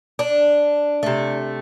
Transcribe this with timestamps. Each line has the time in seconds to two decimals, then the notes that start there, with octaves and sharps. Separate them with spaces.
0.19 D4
1.03 C3 A3